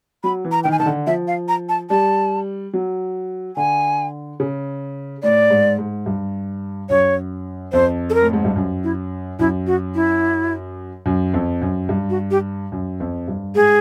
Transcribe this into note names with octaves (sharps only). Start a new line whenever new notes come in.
F#3 B5
E3
A#5
D#3 G5
G#5
D#3 A5
D3
F3 E5
F5
A#5
A5
G3 A5
F#3
D3 G#5
C#3
A2 D5
G#2
G#2
G2
F#2 C#5
F2 C5
A4
A#4
A2
G#2
G2
F#2
E4
F#2 E4
F#4
E4
F#2
F2
F#2
G2
F#4
G4
F#2
F2
G2
G#2 G#4